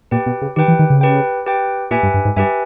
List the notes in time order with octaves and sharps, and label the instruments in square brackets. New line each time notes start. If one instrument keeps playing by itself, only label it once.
[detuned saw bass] A#2 [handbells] G4 B4 G5
[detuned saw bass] B2
C#3
[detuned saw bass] D#3 [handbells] G4 B4 G5
[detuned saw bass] E3
D#3
C#3
[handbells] G4 B4 G5
G4 B4 G5
[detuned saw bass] A#2 [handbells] G4 B4 E5 G#5
[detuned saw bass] G2
G2
G#2
[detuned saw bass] G2 [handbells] G4 B4 E5 G#5